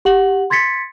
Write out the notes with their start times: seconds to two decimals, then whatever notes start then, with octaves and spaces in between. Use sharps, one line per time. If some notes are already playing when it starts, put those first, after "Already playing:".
0.05 G4 F#5 F#7
0.50 C6 G#6 A6 B6 C#7